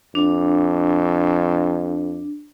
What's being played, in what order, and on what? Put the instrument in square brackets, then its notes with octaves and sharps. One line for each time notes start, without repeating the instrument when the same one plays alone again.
[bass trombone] F2 [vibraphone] D4